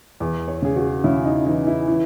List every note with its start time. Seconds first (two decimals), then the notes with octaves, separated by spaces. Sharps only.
0.20 E2
0.48 C#5
0.62 C#3 G#4
0.76 F#4
1.04 C#3 E4
1.25 D#4
1.46 E3 D#4
1.67 E4
1.88 E3